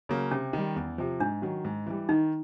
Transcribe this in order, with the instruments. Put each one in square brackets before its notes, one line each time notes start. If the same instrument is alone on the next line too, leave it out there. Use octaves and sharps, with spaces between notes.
[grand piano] C#3 F#3 A#3
[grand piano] C3 [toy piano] C#4
[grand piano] D#3 G3
E2
C3 F3
[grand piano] G#2 [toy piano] D4
[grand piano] D#3 F#3
G#2
E3 G3
[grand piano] D#3 [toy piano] D#4